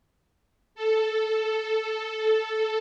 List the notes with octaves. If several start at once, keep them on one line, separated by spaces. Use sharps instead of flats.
A4